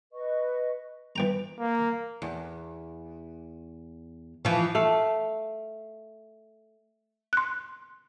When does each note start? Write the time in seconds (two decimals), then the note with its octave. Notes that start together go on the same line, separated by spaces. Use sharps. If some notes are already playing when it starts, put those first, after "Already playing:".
0.13 B4 D#5 C#6
1.16 E3 G5 A#5
1.59 A#3
2.22 E2
4.45 E3 F3
4.75 A3 F5
7.33 C6 F#6